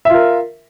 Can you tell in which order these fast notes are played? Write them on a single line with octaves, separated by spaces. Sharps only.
E5 F4 A#4